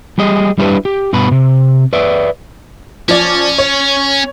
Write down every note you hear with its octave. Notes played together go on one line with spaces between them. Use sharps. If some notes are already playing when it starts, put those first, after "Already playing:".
G3 G4 G#4 D#5
G3 D4 E4 G4 A4 B4
G4
G2 B2 B4 B5
C3
B4 D5 E5
F3 C#4 D5
C#5